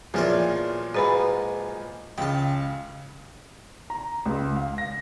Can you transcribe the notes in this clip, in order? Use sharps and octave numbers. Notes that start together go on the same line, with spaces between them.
E2 A#2 F3 F#3 F4 D5
G#2 F#4 B4 B5
C#2 C#3 G5 A5
A#5
C#2
F5
A#6